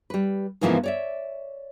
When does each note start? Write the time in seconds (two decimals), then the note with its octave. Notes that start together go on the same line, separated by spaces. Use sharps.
0.10 G3 B4
0.61 G#2 C#3 E3 F3 A#3 B3
0.83 C#5 D5 E5